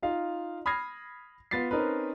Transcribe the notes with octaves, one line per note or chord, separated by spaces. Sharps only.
D#4 F4 F5
B5 D#6 F6 G#6 A#6 C7
B3 F4 A6 B6 C7
C4 C#4 D#4 A#4 B4